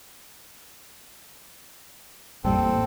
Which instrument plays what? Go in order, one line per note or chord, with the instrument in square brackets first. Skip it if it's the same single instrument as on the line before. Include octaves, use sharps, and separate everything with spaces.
[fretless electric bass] A1 G3 [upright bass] F2 A#3 [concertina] C4 A4